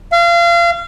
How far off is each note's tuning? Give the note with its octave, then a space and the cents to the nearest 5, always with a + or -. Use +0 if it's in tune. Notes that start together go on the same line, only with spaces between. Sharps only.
F5 -30